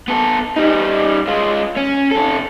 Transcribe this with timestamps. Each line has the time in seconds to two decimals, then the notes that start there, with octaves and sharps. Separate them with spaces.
0.08 B3 A4
0.57 G3 D#4
1.28 G#3 F4
1.77 C#4
2.12 C3 A4